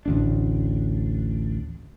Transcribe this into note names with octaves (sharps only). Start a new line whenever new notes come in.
A1 D2 D4